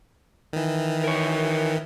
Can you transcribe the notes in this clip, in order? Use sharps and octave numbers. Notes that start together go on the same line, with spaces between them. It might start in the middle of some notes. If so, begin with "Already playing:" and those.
D#3 E3
A#4 C#5